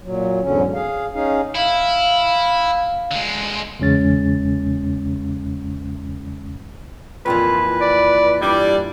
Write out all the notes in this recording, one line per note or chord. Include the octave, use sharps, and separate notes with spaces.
A#2 F#3
E2 G#2 D3 F#3 C#4
G#4 F5
C#4 D#4 G#4 F5
E4 F5
D3 G#3
E2 C#3 G#3 C#4 A6
F2 A#2 E3 F4 B4
D5
G2 G3 E4 D5